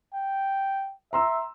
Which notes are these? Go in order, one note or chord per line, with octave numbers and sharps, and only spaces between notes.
G5
E5 A#5 C6 E6